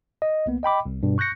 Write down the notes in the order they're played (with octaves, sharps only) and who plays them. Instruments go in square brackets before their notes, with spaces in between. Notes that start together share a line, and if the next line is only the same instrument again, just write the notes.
[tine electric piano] D#5
C2 A#3 B3
D#5 G5 B5 D6
C2
G2 B2
C#6 F#6 G6 A#6 C#7